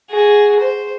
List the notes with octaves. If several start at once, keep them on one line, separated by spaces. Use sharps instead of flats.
F#4 G#4
C5